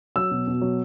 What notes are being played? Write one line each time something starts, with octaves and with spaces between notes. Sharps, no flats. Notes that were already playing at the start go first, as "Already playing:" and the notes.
F#3 E6
B2
B2
F#3